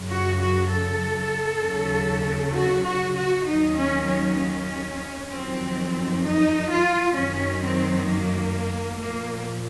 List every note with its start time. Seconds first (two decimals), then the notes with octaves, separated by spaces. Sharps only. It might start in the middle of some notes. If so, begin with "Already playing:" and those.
Already playing: F#2 C#3 F#3
0.10 F#4
0.40 F#4
0.70 A4
1.62 D#2 C#3 F#3
2.54 F#4
2.86 F#4
3.16 F#4
3.47 D#2 D#3 F#3 D#4
3.77 C#4
4.08 C#4
4.39 C#4
5.30 F2 D#3 F#3 C4
6.24 D#4
6.69 F4
7.15 F#2 D#3 F#3 C#4
7.62 C4
8.07 A#3
9.00 A#2 F3 A#3